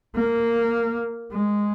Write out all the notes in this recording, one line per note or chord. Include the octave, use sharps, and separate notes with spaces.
A#3
G#3